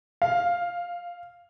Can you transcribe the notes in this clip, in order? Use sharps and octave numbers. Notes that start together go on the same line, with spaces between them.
F5